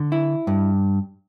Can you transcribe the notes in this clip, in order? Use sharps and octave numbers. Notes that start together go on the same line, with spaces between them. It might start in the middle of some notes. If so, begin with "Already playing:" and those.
Already playing: D3
E4
G2